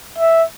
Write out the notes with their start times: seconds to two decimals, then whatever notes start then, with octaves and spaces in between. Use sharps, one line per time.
0.18 E5